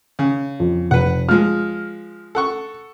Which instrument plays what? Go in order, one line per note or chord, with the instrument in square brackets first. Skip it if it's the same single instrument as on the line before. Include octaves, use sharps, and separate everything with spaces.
[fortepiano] C#3
[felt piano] F2
[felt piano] F1 [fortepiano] B4 F#5
[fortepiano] F3 G#3 [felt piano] F6
[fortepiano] A4 F#5 C#6